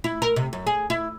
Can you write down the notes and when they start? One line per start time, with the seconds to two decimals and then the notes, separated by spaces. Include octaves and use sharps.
0.04 E4
0.22 A#4
0.36 C3
0.53 F#2
0.67 G#4
0.90 E4